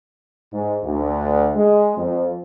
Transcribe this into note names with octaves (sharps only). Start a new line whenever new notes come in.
G#2
D2
G#3
F2